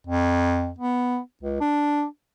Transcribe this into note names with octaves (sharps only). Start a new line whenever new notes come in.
F2
B3
C#2
D4